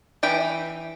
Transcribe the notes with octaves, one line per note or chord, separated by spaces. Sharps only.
E3 G5 B5